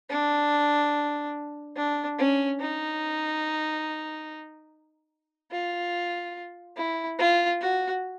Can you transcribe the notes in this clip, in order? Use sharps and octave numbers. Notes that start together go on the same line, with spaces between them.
D4
D4
C#4
D#4
F4
E4
F4
F#4